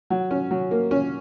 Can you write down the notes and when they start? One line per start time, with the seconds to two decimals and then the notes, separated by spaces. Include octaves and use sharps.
0.10 F#3
0.31 C#4
0.51 F#3
0.71 A#3
0.91 C#4